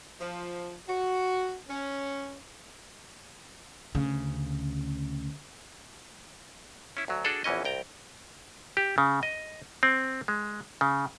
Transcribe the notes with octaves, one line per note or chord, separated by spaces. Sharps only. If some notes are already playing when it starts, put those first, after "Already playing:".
F3
F#4
C#4
D2 C#3
C#4 E4
D2 F#3
D4 F#4 G#4 A4 D5
A#1 E2 E3 C#4 D#5
C2 G5 A#5
G4
C#3
D#5
C4
G#3
C#3